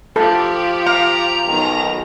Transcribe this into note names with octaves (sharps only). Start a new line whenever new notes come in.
F3 G4 A4 A5
F5 A#5
B1 D#3